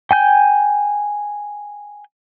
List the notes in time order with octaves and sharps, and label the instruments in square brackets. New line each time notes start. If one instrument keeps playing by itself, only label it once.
[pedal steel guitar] G5 G#5 G6